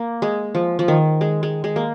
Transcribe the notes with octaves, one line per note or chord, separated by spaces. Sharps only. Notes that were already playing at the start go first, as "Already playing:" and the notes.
Already playing: A#3
G#3
F3
F3
D#3
G#3
G#3
G#3
A#3